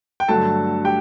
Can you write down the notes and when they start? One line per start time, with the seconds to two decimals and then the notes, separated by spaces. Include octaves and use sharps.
0.20 G5
0.28 G2 D3 F#3 A3 A4 A5
0.85 G4 G5